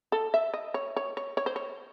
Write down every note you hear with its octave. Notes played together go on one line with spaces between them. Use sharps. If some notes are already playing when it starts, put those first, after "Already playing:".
A4
E5
D#5
C#5
C#5
C#5
C#5
C5
C#5